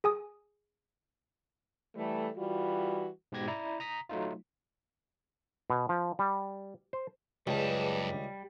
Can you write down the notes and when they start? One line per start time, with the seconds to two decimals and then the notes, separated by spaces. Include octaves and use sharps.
0.04 G#4 G#5 D#6
1.96 E3 G3 A3
2.37 E3 G3 F4 F#4
3.32 G#2 B2 G4 G#6 A#6
3.48 E4 D5 A#5
3.80 A#5 D#6 B6
4.09 F#3 A3 D#4 F4
5.70 B2
5.89 F3
6.19 G3
6.93 C5
7.47 C#2 F#2 G3 G#4 B4 A5